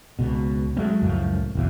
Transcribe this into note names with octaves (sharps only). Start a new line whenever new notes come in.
C#2 B2
F#3 G#3 A3 C4
C#2 F#2 A2 F3
F#1 B1 E2